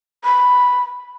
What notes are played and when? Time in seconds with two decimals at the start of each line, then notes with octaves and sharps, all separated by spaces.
0.24 B5